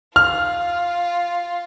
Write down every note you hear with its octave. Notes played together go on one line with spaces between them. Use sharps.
F4 F6